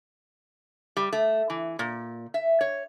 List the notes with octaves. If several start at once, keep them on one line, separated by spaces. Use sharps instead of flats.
G3
A3
E3
A#2
E5
C#5